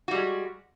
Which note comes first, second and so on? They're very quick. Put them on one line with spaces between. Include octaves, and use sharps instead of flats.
F#4 G3 G#3